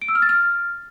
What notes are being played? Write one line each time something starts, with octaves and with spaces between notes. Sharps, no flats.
D7
E6
F6
A6
F6